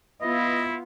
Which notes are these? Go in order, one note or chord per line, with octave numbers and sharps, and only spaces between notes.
B3 E4 F4 D#5